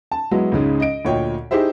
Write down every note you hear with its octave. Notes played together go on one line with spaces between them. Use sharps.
A5
F#3 G#3 B3 E4 F#4
C#2 G#2 C#3 G#3
D#5 D7
D2 A#2 C#5 D#5 G5
D#4 E4 G4 G#4 C5 E5